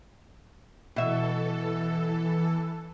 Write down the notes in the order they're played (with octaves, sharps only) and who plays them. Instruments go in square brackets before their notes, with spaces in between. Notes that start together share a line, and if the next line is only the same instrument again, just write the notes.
[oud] B2 E5 [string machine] E3 A4